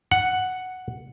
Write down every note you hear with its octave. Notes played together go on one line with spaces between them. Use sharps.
F#5